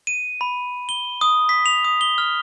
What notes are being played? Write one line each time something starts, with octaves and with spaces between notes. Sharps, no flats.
D#7
B5
G7
D#6
B6
F7
D#6
G7
F6